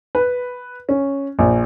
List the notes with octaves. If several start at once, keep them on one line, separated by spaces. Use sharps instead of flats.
B4
C#4
A#1